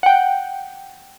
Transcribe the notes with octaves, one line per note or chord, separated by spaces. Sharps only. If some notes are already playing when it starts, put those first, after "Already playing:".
F#5 G5